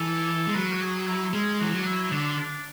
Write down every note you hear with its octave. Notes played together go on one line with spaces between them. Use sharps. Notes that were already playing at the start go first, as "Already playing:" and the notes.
Already playing: E3 A4
G#3
F#3 B4
F#4
G#4
E4
G#3 C#4
E3 F#4
F#3 D4
E4
D3 D4
D4